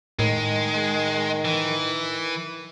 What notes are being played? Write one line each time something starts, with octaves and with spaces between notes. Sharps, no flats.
A2 D#3 G#3
E3